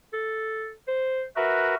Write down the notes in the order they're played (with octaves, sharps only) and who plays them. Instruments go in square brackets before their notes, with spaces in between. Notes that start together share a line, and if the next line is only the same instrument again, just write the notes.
[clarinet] A4
C5
[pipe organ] F#4 A#4 B4 [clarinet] E5